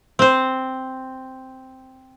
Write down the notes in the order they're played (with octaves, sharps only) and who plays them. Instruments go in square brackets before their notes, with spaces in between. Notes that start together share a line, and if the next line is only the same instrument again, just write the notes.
[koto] C4 C5